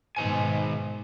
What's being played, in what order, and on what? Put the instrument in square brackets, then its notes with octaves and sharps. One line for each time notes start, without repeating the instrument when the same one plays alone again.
[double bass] G#2 B2 [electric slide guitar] D#3 C5 G#5